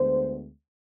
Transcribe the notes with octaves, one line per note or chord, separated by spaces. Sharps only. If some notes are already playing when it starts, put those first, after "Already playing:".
Already playing: D2 D3 G#3 B3 C5